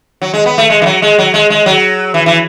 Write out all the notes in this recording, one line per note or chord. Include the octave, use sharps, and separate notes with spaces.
F#3
G#3
B3
A3
G#3
E3
F#3
G#3
F#3
G#3
G#3
F#3
E3
E3